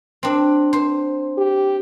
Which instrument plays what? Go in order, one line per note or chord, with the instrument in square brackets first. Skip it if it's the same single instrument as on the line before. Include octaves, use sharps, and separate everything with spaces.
[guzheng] C4 D4
C5
[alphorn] G4